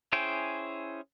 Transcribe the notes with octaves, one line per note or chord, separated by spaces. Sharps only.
C#4 E4 G#4 C5 G5